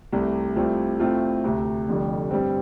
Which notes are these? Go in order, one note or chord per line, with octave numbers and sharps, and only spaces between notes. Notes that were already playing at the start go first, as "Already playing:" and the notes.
C2 C3 A3
C2 C3 A3 C4 F4
A2 A3 C4 F4
D2 C3 A3
F1 F2 D3 G3
G2 G3 C4